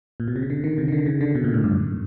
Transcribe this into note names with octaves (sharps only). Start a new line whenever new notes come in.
A#2
B2
C3
C#3
D3
D#3
C3
D#3
D3
C#3
D3
B2
A#2
A2
G2
F#2